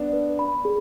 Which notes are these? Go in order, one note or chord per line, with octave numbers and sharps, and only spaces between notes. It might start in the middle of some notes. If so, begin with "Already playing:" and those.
Already playing: B3 D4 B4
B4
B5
G#4